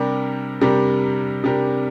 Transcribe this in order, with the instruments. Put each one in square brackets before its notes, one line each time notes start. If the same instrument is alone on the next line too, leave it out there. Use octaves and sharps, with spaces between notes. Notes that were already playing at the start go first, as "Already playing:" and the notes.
Already playing: [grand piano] C3 G3 D4 G4 A#4
C3 G3 D4 G4 A#4
C3 G3 D4 G4 A#4